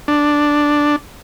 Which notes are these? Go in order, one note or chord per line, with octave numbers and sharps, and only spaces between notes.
D4